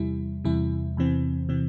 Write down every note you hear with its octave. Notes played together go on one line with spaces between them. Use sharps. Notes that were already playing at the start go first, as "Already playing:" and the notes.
Already playing: E2 C3 G3 E4
E2 C3 G3 E4
E2 C3 E3 C4
C3 E3 C4